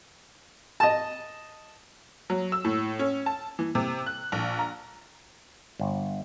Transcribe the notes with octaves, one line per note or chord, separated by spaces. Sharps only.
D#5 A5
F#3
E6
A2
C#4
A5
E3
C3
F#6
A#1
A#5
G1